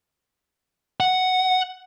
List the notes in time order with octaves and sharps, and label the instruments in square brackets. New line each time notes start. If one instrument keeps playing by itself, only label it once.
[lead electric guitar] F#5